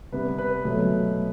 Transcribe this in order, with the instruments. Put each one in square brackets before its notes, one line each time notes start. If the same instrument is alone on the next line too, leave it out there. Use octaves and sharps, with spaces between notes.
[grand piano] C3 G3 B3 B4
B4
B2 F#3 A3